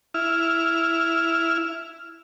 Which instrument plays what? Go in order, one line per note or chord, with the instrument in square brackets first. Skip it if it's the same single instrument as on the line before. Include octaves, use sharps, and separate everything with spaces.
[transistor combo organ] E4 F6